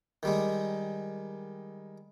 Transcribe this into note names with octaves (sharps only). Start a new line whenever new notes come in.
D#3 G3 G#3